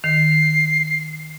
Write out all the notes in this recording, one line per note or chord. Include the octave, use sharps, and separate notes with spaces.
D#3 C7